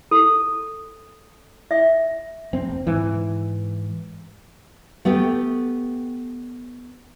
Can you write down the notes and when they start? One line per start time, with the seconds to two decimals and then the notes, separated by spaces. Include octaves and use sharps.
0.11 A4
1.71 E5
2.53 F1 C4
2.87 G#2 E3
5.05 A3 B3 G4